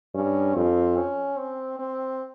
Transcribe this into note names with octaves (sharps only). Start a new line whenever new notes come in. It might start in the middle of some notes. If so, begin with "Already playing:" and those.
G2 C#4
F2 C4
C#4
C4
C4